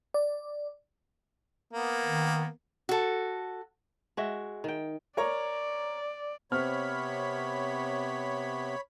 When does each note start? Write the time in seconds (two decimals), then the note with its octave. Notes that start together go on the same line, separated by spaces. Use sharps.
0.14 D5
1.73 A#3 B3
2.05 D#3
2.89 F#4 A4
4.17 G#3 F#4 E5
4.64 D#3 G5
5.17 A#4 C#5 D5 A#5
6.52 C3 B3 C4 C#5 B5 F6